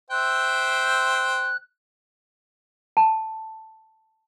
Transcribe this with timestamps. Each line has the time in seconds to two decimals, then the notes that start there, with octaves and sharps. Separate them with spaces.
0.11 C5 E5 G5 F#6
2.97 A5